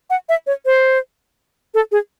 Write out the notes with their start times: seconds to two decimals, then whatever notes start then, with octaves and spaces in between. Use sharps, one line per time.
0.10 F#5
0.29 E5
0.47 C#5
0.66 C5
1.74 A4
1.92 G#4